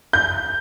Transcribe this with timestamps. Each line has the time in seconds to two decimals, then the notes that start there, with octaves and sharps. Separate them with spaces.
0.13 G6